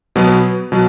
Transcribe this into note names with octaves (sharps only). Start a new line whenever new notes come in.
B2 F#3 B3
B2 F#3